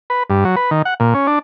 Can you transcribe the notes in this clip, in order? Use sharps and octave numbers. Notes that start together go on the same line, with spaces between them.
B4
G2
F#3
B4
D#3
F#5
A#2
C#4
D4